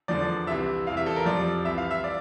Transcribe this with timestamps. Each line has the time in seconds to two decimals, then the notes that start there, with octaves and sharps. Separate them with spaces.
0.08 E2 D3 F3 D5
0.47 C2 C3 E3 E5
0.87 E2 C3 E3 F5
0.97 E5
1.06 A4
1.16 A#4
1.25 F2 C3 F3 D5
1.65 C2 C3 E3 E5
1.78 F5
1.91 E5
2.04 D5